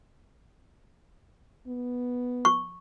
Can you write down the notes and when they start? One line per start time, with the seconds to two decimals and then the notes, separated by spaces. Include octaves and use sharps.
1.68 B3
2.45 C#6